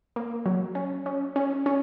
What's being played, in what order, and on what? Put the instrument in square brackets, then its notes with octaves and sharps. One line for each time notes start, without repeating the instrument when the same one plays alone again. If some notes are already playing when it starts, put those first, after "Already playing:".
[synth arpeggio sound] A#3
F#3
C#4
C#4
C#4
C#4